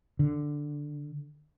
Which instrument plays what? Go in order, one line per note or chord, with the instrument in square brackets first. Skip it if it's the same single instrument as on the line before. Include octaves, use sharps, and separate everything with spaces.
[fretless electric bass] D3